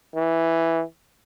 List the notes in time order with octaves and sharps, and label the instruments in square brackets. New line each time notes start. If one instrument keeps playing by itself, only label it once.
[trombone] E3